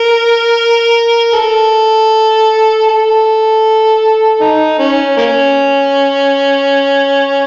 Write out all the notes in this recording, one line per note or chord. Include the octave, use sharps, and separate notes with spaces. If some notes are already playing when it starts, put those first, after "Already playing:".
Already playing: A#4
A4
A4
D#4
C#4
A#3 C#4